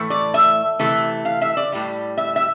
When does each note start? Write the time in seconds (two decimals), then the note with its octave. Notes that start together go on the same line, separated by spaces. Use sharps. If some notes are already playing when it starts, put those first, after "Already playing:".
Already playing: A2 E3 A3
0.10 D5
0.34 E5
0.79 C3 E3 A3
1.25 F5
1.42 E5
1.57 D5
1.72 A2 G3
2.18 E5
2.36 E5